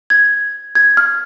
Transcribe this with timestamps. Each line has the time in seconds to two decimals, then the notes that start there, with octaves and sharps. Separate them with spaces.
0.10 G#6
0.75 G#6
0.97 F6